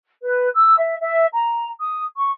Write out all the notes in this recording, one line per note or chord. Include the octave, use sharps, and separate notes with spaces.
B4
E6
E5
E5
A#5
D#6
C#6